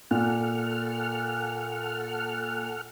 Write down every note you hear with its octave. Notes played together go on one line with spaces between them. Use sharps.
A#2 A4 F#5 F6